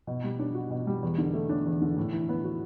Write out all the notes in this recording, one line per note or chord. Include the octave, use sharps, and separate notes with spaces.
B2
G3
D4
F#4
B2
G3
E2
D3
A3
D4
E2
D3
A2
E3
B3
F#4